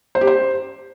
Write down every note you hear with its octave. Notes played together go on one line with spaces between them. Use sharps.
C5
G4
C5